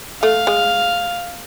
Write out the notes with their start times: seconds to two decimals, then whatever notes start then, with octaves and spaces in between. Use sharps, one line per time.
0.22 A3 F5
0.47 G#3